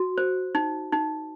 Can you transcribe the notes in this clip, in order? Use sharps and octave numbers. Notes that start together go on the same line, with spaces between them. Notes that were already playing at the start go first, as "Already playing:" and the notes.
Already playing: F#4
C5
D#4
D#4